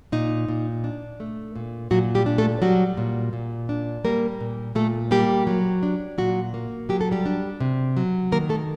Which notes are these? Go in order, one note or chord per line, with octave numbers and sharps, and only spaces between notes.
A#2 D#4
A#2
D4
A3
A#2
A#2 F#3 F#4
G3 G4
D4
A3 A4
F#3 G3 F#4
A#2
A#2
D4
G3 A#3 A#4
A#2
A#2 A3 A4
G3 A#3 G4
F#3
D4
A#2 F#3 F#4
A#3
F#3 G4
A4
G3 G4
D4
C3
F#3
D#3 A#3 A#4
A3 A4